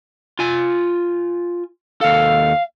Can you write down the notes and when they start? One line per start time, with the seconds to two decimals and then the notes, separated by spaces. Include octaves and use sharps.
0.39 F4 G#5
2.01 D#2 A4 F5